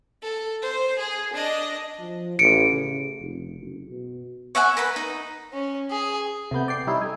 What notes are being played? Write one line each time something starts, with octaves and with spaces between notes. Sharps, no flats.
A4
C5
G#4
D4 D#5
F3
A1 C#7 D7
C#3
F1
F#1
B2
C#5 E5 F#5 G#5
A#4 B4 B5
D#4
C#4
G#4
C3 A3 B3 G6
D5 G5 C7
G3 C#4 D#4 E4
A3 G#5